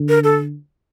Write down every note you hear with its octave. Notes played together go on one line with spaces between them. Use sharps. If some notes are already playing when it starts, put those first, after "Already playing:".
Already playing: D3
A#4
A4